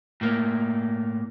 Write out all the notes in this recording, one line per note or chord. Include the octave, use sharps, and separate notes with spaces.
A2 A#3